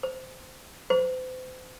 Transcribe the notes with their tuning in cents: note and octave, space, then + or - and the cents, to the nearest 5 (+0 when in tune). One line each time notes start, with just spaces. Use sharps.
C5 -15
C5 -40